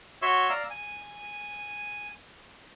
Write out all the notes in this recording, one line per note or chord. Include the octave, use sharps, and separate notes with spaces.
F#4 C#5 E5 C6 C#6 E6
D5 F5 A#5 E6
G#5